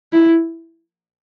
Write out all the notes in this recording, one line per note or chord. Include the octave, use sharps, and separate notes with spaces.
E4